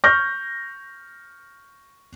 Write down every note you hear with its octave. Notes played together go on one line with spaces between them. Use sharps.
C#6 F6 G6 A#6